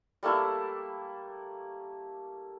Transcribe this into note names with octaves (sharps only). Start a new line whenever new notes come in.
G3 A3 A#3 E4